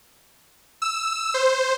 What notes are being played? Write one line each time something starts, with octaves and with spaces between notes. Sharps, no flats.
E6
C5